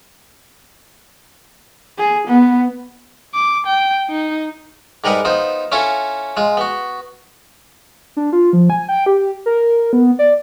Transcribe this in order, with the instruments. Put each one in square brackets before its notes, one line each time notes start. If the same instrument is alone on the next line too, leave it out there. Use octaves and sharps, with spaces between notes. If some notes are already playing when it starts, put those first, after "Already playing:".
[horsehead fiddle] G#4
B3
[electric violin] D6
G5
D#4
[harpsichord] G#2 G3 A#4 B4 F#5 D#6
B3 D#4 F4 C5
C#4 E4 F4 A4 C#5
G#3 F4
B3 F#4
[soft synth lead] D4
F4
F3
G#5
G5
G4
A#4
B3
D5